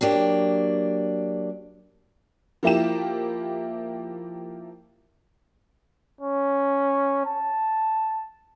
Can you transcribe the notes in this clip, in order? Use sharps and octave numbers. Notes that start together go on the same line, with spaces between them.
F#3 A#3 D4 G4
F3 A#3 E4 G4 E7
C#4
A5